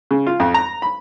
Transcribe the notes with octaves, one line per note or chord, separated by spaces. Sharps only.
C#3
F4
F2
A#5
B5